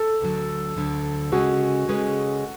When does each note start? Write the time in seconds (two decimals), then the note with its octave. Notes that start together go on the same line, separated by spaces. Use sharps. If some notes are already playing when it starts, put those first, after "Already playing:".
Already playing: A4
0.21 D2 D3 F#3
0.77 D2 D3 F#3
1.32 C#3 G#3 C#4 F#4 G#4 B4
1.87 C#3 G#3 C#4 G#4 B4